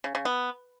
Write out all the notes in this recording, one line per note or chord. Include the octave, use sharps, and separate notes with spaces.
C#3
C#3
B3